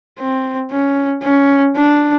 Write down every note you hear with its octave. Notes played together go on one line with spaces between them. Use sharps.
C4
C#4
C#4
D4